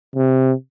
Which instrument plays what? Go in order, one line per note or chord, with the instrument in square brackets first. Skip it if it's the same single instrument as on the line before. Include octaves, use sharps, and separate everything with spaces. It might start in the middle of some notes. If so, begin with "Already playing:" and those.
[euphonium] C3